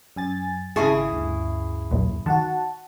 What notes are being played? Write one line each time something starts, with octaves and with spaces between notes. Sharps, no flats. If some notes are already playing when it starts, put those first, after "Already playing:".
F#2 G#5 A6
G#1 C#3 E4 G#4 A5 C#6
D2 G2
B1 E2 A#2
D#3 F#4 F#5 A5